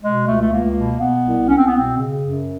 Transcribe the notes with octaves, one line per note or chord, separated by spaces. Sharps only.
B2 G#3
C#2 A3
A3
C#2 A#3
B2
B2 B3
C2
C2 C#4
C4
B3
B2 C4
C#3
F#2